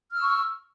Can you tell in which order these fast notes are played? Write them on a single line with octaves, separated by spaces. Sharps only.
F6 E6 C#6